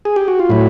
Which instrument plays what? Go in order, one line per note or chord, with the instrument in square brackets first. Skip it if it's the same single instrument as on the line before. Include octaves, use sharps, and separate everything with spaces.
[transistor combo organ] G#4
G4
F#4
F4
A2 F#3 E4